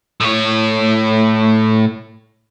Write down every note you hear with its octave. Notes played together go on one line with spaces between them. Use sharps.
A2 C#5